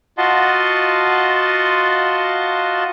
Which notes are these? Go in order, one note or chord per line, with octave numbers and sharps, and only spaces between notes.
F4 F#4 D#5 F#5 A5 C6